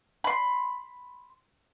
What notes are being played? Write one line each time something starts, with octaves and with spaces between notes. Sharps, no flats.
B5 C6